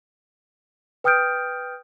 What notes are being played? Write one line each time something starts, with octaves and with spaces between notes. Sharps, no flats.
B4 G5 D#6 F6 G6 D7